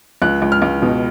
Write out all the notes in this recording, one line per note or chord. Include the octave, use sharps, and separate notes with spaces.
C#2 F#6
C#2
F6
C#2
B2